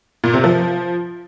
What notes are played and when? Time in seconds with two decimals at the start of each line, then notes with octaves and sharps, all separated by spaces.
0.24 A#2
0.34 C3
0.44 F3